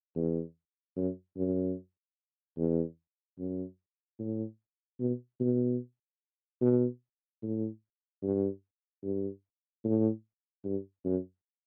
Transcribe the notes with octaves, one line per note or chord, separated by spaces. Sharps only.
E2
F#2
F#2
E2
F#2
A2
B2
B2
B2
A2
G2
G2
A2
G2
F#2